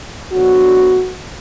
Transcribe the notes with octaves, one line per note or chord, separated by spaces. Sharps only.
D2 D3 F#3 B3 F#4